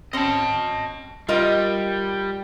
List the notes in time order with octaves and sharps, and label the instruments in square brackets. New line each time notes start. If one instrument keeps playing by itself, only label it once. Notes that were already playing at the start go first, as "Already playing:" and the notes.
[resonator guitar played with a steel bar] C4 C#4 [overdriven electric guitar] D#5 A5
[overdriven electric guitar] G3 [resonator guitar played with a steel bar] F4 A#4 D#5